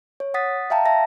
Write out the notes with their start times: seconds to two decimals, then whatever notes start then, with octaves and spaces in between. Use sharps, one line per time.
0.20 C#5
0.34 F#5 D#6 A6 B6
0.70 E5 F5 G5 A5 A#5
0.85 E5 A5 A#6